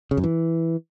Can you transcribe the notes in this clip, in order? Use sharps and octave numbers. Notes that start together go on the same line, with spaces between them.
C#3
F#2
E3